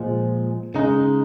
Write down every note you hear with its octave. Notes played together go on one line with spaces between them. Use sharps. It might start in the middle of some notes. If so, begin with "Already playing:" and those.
Already playing: A#2 F3 G#3
C#3 G#3 D#4